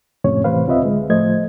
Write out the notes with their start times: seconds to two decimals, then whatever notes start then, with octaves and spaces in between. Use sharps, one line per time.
0.24 F2 A2 C3 C#4 C#5
0.44 A2 C3 E3 B4 C5 F5
0.67 C#2 C4 F4 B4 D#5 E5
0.81 D3 G#3
1.10 A2 F3 A3 C5 D#5 G#6